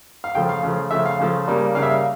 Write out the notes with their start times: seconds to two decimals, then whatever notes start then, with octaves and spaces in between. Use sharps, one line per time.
0.24 F5
0.35 C#3 F3 A3 G5
0.49 F5
0.63 C#3 F3 A3
0.91 C#3 F3 A3 E5
1.05 F5
1.20 C#3 F3 A3
1.48 C#3 G3 A#3
1.75 C#3 G3 A#3 F5
1.83 E5
1.90 F5